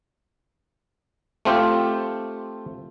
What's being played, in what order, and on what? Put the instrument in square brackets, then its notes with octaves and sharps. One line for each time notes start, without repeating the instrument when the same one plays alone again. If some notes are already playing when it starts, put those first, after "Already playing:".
[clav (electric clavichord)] A3 C4 F4 G4